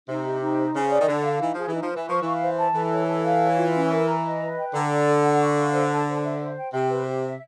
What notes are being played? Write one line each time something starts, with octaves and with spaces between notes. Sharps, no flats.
C3 D#4
G4
D#4
C5
C#3 G#5
D5
D#3
D3 A4
F5
E3 D#4
F3 G#4
E3
D#4
F3
E3 B4
F3 C#6
E3 F5
C5
A5
E3 A4
C#5
A4
F5
C#5
F4
C#4
A#4
A#5
D#5
B4
G5
D3 A#5
D5
A4
F#5
C#6
F5
C5
A5
C5
E5
C5
G5
C3 G5
B4
G4
E5